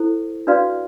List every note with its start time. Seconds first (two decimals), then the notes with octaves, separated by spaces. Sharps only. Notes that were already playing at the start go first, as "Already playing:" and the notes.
Already playing: E4 A4 C5
0.47 D4 F#4 B4 D5 F5